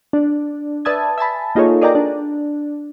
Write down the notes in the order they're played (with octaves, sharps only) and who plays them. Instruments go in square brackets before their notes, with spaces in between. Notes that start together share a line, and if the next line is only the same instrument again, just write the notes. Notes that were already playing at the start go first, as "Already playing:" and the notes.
[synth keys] D4
B4 D5 E5 A5 D#6 G#6
E5 G#5 A5 B5
A#3 D#4 F4 G#4 A4 C#5
G#4 A#4 D5 D#5 G5 A#5
D4